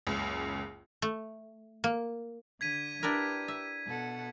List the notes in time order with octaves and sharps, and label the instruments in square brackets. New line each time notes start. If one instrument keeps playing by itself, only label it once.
[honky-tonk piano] F#1 C#2
[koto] A3
A#3
[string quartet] D3 [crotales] G#6 B6 D#7
[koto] D4 E4 A#4 [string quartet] G4 B4
[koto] E5
[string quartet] B2 A4 F#5